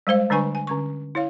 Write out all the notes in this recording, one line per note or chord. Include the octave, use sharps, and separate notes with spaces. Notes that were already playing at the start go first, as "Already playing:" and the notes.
G3 G#3 C5 F5
D3 G3 D4 B4 G#5 C#6
G#5
D3 C#4 C#6
E4 C#5 F5